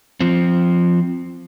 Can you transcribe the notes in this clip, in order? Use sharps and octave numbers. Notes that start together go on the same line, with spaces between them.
F3 C4